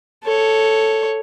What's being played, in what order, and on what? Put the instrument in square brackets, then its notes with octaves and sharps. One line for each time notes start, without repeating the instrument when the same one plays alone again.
[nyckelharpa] A4 C#5